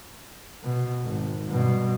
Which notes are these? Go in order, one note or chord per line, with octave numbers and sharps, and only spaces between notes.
B2
G#1
G2 B2